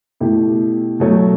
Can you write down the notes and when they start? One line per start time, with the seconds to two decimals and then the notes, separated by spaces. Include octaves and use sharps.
0.20 B2 A3 E4 G4
1.00 B2 F#3 A3